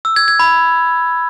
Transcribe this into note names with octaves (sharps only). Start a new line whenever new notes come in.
E6
G#6
G#6
B5